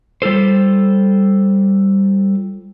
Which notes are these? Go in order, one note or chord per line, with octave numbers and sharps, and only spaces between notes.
G3 F4 A4 C5